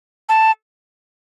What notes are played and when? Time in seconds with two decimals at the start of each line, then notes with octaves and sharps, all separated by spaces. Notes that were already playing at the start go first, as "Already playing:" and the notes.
0.29 A5